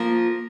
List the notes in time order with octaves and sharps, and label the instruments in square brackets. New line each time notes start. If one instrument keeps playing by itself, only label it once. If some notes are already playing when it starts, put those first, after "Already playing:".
Already playing: [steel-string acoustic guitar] F3 A#3 F4 A#4